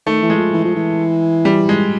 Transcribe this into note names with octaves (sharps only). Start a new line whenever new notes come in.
D#3 A3
E3
G#3
F3
E3
F3
E3
G3
G#3